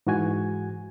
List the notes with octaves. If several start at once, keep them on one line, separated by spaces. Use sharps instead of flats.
G#2 E3 F#4 G#5 G#6